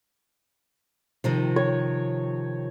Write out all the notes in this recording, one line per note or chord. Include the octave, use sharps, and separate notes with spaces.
C3 D#3 F3
C#5